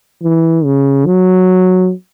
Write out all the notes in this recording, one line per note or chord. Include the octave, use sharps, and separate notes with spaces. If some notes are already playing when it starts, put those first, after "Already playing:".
E3
C#3
F#3